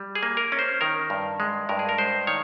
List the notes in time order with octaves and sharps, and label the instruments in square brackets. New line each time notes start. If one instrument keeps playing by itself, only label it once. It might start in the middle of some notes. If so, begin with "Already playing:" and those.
Already playing: [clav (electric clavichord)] G3
G#4
A#3
A#4
C#4
C5
D#3 A#4
G2
G#3
G2 A#4
G#4
A#4
G#3 C5
D#3 C#5